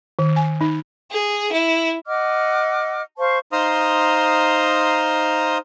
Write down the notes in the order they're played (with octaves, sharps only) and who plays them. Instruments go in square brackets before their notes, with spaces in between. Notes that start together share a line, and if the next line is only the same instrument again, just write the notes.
[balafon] D#3
G#5
D#4
[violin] G#4
E4
[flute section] D#5 F#5 D6 F6
C5 F5 A5 C#6
[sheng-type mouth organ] D#4 C5 F5 A#5 C6 D#6